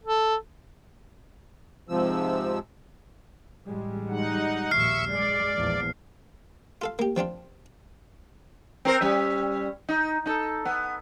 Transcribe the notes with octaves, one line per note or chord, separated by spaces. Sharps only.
A4
G#2 C3 F3 E6
A1 G3 G#3
D#4 F#5
A#1 D#2 E5 C#6 F6 C7
F#2 G#3 D5
A#1 E2 F3
F4 A4 F5
A#3 G4
F3 C4 D4 F4
C4 A#4 C5
G3 C#4 E5
D#4
D#4 A4
B3